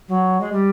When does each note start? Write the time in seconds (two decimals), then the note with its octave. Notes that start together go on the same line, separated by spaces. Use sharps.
0.08 F#3
0.40 G#3
0.52 G3